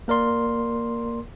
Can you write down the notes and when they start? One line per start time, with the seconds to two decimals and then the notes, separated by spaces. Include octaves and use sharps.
0.08 A#3 A#4 D5 C6